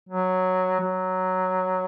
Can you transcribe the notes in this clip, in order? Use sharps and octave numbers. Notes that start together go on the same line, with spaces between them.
F#3
F#3